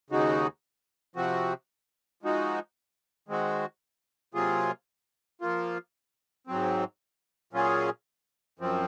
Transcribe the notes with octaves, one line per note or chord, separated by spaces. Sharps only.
D#2 C#3 G#3 D#4 F#4
C3 F3 C4 F#4
F3 G#3 D#4 F#4
D#3 G#3 C4 F#4
C3 F#3 A#3 F4 G#4
F3 A#3 F4
G#2 F#3 C4
A#2 F#3 C#4 F4 G#4
F#2 F3 C4